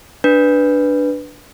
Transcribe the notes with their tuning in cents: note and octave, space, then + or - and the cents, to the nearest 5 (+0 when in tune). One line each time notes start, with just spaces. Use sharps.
D4 +0 B4 +0